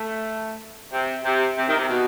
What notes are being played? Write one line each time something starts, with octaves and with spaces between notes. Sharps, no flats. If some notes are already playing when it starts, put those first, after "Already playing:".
Already playing: A3
C3
C3
C3
D#3
C3
B2